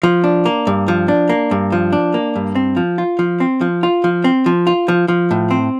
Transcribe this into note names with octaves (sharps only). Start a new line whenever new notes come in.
F3
D4
A#3
G2
F3
D4
A#3
G2
F3
D4
A#3
G2
C4
F3
F4
F3
C4
F3
F4
F3
C4
F3
F4
F3
F3
A2
C4